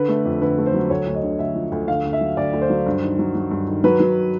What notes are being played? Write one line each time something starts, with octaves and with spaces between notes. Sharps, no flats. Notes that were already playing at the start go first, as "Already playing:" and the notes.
Already playing: D3 B4
A3
F2
D3 B4
A3
C5
F#3
D2 C#5
D2
D#5
D3
D2 E5
F3
D2
D3 F5
D2
E5
F#3
D2 D5
D2
C5
F#3
G2
D#3
F#3
F#3
G2
D#3
F#3 B4
F#3